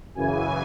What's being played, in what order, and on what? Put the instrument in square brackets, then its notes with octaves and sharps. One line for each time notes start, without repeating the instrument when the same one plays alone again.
[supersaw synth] F#2 C#3 E3 G#5